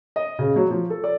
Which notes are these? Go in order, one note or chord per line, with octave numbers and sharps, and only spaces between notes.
D#5
C#3
F#3
F3
A4
D5